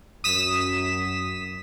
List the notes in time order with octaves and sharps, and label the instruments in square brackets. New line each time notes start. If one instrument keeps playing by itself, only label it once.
[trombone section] F#2 [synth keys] D#6 B6 E7